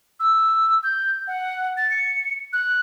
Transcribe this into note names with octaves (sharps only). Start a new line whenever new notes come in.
E6
G6
F#5
A6
C#7
F#6